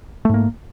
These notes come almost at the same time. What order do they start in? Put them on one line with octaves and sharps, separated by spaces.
A3 G#2 A#3